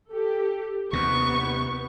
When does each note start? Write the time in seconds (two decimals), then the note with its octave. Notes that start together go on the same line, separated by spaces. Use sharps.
0.11 G4 A4
0.93 D#2 C3 B3 C#6